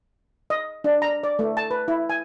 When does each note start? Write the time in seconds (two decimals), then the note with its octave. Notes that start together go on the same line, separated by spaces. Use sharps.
0.50 D#5
0.84 D4
1.02 A#5
1.23 D5
1.39 A3
1.57 A5
1.71 B4
1.88 E4
2.10 G#5